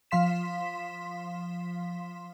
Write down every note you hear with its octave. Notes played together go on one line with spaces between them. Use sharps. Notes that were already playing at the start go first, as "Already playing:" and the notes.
F3 F5 C6 B6 E7